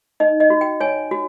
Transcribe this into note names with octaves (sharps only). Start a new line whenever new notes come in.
D#4 D#5
D#5
F#4
G5
C#5 G#5
F#4